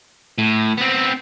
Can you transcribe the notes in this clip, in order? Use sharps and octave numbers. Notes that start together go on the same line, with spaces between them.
A2
B3 C4